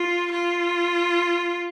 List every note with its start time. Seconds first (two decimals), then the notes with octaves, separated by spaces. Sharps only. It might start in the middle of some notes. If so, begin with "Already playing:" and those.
Already playing: F4
0.31 F4